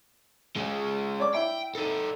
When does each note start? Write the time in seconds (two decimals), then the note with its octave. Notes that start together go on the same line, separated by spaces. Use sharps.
0.56 G#3 C#4
1.20 C#5 D5 D6
1.35 E4 G5
1.75 D#4 A4